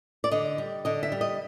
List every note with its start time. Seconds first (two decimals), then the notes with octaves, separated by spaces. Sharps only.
0.24 D5
0.31 D3 D#5
0.58 G3
0.85 D3 D#5
1.03 E5
1.12 G3
1.21 D#5